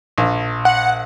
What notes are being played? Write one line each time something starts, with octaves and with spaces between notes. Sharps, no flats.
A#1
F#5